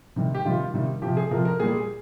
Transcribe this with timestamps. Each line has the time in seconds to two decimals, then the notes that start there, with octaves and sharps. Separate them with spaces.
0.16 C3 D#3 G3
0.35 G4
0.45 C3 D#3 G3 F4
0.74 C3 D#3 G3
1.02 F3 G4
1.06 C3
1.17 G#4
1.31 C3 F3 A#4
1.45 A#4
1.60 A#2 G3 G#4